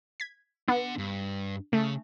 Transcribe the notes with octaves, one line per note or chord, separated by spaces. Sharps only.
G#6 B6
B3 D4 F#5
G2
C#3 A3